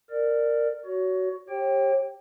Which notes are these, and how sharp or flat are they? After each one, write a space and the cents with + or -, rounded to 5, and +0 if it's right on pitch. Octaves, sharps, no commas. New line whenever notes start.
A#4 -10 D5 +15
F#4 +15 C#5 +30
G4 +0 C#5 -40 G5 +0